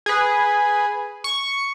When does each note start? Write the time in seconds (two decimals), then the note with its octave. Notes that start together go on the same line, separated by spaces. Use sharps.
0.06 G#4 B4
1.24 C#6